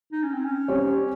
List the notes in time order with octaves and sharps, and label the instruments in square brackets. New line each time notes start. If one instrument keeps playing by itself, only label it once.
[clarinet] D#4
C#4
C4
C#4
[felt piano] G3 C4 G4 C#5